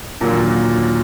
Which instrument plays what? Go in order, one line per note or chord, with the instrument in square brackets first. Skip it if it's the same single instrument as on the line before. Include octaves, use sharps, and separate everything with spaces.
[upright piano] D#2 D3 F#3 A#3 [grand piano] A#2